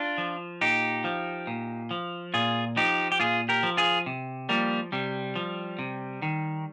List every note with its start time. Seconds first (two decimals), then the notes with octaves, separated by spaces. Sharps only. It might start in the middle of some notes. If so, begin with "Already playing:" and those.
Already playing: D4 F4
0.18 F3
0.61 A#2 D#4 G4
1.04 F3
1.47 A#2
1.91 F3
2.34 A#2 F4 G#4
2.77 F3 D#4 G4
3.12 G4
3.20 A#2 F4 G#4
3.49 G4 A#4
3.63 F3
3.77 F4 G#4
4.06 C3
4.49 F3 G3 A#3
4.92 C3 G3
5.36 F3
5.79 C3
6.22 D#3